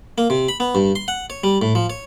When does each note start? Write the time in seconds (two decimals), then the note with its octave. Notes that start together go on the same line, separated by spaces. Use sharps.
0.18 A#3
0.30 C3
0.48 B5
0.60 B3
0.75 G2
0.95 C6
1.08 F#5
1.30 C#5
1.44 G3
1.62 A2
1.75 F3
1.90 C#5